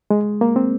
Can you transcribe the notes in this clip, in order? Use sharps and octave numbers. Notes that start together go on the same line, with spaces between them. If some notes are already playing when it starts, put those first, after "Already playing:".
G#3
A#3
C4